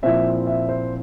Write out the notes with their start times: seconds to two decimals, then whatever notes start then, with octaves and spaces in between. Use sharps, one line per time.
0.02 A#2 F3 C4 E4 E5
0.47 E5
0.69 C5